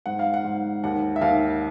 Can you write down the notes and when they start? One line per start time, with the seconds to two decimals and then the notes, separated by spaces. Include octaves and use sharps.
0.06 G#2 F#5
0.19 F5
0.34 F#5
0.44 G#2
0.83 D#2 F#5
1.16 E5
1.21 D#2 F5